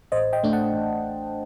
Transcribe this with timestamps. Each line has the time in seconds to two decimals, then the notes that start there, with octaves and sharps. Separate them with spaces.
0.12 A1 C5 D#5
0.33 D#5 G5
0.43 A2 A3 D4
0.53 F#5 A5
0.73 A1